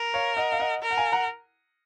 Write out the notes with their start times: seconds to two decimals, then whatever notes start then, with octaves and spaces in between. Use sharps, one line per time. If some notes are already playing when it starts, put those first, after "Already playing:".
Already playing: A#4
0.14 C#5 F5
0.37 D#5 F#5
0.52 F5
0.60 D#5 F#5
0.82 A#4
0.91 F#5
0.97 F5 G#5
1.12 F#5 A#5